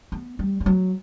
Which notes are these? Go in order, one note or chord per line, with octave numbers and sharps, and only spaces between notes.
B3
G3
G3
F#3